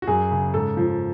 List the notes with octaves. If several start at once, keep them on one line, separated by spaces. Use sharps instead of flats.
F#4
F#2 G#4
C#3
G#2 A4
F3